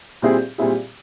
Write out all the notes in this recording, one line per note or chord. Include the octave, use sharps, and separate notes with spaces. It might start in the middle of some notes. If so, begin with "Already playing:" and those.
A#2 G3 C4 E4 G#4
A#2 G3 C4 E4 G#4